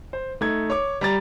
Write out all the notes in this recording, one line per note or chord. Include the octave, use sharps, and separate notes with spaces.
C5
A3 D#4 G#6
C#5 D6
G3 A#5 A6